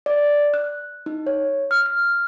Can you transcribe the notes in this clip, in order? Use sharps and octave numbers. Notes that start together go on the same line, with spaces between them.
D5
F#6
D#4
C#5
F6
F6